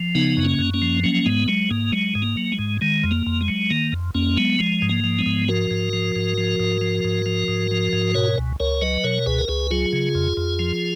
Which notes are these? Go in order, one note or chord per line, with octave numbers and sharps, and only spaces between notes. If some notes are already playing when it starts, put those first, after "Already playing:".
Already playing: F3
C#3 B3 D#4
F#2
A#3 C#4
F#2
A#3 C#4
F3
F#3 A#3 C#4
G#2 G#3 B3
F#3 G#3
G#2 A#3
F#3 G#3
G#2
A#3
F#3
G#3
G#2
D#3 G#3
F2
A#3
F2
G#3
F#3
D#3 A#3
F2
F2 A#3 C#4
F#3 G#3 B3
F3 G#3
G#2
A#3
F3
G#3 B3
G#2
F3 F#4 A#4
G#2
F3
G#2
F3
G#2
F3
G#2
F3
G#2
F3
G#2
B2 A#4 C#5
C#2
C#2 A#4 C#5
F#3 B4 D#5
B2 A#4 C#5
C#2 G#4 B4
A#4
C#2 G#4 B4
F#3 F4 G#4
C#3
F2
F2
F3